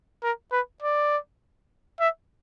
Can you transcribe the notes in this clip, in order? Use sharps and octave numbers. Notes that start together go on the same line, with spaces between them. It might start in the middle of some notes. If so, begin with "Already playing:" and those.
A#4
B4
D5
E5